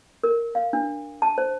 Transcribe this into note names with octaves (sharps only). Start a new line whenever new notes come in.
A#4
F5
D4
A5
C5